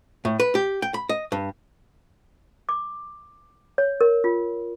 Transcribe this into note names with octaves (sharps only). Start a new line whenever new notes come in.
A2
B4
G4
G5
B5
D#5
G2
D6
C#5
A#4
F4